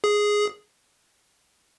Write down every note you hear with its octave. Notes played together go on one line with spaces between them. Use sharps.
G#4